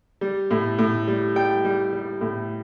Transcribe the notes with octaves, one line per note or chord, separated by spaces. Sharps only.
G3
A2
A2
G3
G3 G5
G3
G3
A2